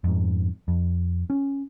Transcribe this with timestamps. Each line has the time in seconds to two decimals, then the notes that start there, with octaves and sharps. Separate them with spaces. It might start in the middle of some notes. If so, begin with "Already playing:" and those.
0.04 F2 G#2
0.68 F2
1.30 C#4